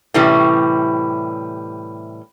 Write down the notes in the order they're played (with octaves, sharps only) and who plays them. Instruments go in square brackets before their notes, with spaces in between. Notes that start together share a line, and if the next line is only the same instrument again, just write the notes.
[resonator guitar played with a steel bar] A2 C3 E3 G3 C#4